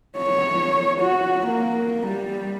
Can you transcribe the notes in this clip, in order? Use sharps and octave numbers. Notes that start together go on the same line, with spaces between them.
C#5
F#4
A#3
G3